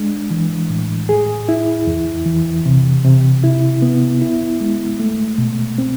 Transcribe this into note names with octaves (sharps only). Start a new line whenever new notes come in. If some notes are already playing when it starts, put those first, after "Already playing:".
Already playing: G#3 D4
E3
A2
G#4
E4
E2
E3
C3
C3
E4
B3
E4
G#3
A3
B2
C4